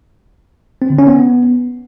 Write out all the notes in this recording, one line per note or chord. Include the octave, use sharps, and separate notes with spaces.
C4
D3
C#4
B3